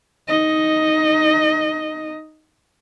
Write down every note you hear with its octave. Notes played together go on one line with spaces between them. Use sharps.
D#4 D#5